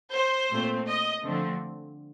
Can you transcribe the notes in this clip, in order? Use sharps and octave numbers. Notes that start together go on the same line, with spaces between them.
C5
A#2 A3 C4
D#5
D3 F3 A3 C4